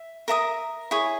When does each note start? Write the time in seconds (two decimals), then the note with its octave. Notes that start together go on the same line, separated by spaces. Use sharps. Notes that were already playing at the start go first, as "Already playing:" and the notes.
Already playing: E5
0.28 A#4 E5 A#5 D#6
0.91 E4 G#4 C#5